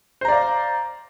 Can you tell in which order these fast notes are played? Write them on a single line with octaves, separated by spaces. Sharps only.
C5 A#5 D5 F5